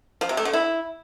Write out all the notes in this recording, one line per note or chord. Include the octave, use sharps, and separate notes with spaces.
F3
C3
A3
D3
E4